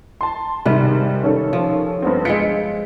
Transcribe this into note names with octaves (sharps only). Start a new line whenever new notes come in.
A5 C6
G#2 C3 D#3 G3 B4
D#3 C#4 A4
F3
G2 B3 C4
G#3 C4 F4 B6 C#7 D7